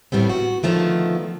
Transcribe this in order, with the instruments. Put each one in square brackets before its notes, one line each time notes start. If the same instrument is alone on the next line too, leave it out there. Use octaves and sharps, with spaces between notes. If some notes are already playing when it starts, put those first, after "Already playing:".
[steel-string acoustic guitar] A2 G3 B3 C4
F#4
D3 D#3 F3 A3 B3